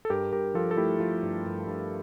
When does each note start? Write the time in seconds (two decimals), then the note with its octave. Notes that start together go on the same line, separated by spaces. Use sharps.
0.05 A4
0.10 G2 G4 A#4
0.32 G2 G4 A#4
0.54 F3 F4 A4
0.71 A4
0.77 A3 E4 G4
1.00 F3 F4
1.23 G2
1.45 G2
1.67 G2